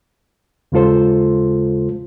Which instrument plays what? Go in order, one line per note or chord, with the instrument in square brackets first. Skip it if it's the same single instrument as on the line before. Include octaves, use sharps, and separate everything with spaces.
[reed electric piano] D#2 C#3 G#3 F4 A4 C5